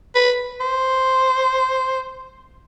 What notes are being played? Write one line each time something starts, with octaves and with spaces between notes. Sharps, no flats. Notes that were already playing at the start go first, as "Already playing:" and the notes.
B4
C5